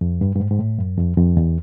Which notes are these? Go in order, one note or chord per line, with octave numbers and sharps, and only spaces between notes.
F2
G2
G2
G#2
G#2
A2
F#2
F2
F2
E2